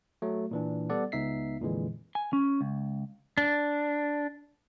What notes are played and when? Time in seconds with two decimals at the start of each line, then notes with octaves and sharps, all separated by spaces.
0.22 F#3 A3
0.51 A#2 E3 D4
0.90 G3 B3 A4 D5 F#5
1.12 C#2 B3 D#4 E5 B6 C7
1.60 F2 A#2 D3 E3 G#3
2.15 G#5
2.33 C#4
2.61 C#2
3.38 D4